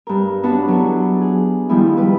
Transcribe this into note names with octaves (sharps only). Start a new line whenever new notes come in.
G2 A#4
B3 D4 F#4 C#5 A5 B5
F#3 D4 E4 G#4 A4
G#4
D#3 F3 G3 G#3 B3 E4
G3 B4